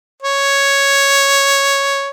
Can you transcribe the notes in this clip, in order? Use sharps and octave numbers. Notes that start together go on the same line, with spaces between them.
C#5